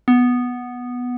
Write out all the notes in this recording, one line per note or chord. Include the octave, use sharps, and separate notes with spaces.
B3